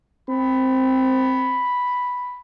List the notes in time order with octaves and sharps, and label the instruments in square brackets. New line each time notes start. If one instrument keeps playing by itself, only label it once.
[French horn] C4 [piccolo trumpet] B5